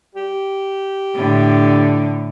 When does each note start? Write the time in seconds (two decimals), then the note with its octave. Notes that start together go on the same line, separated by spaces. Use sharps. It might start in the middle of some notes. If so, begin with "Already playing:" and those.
0.15 G4
1.16 A2 D3